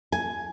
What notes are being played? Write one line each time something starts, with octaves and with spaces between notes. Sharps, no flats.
G#5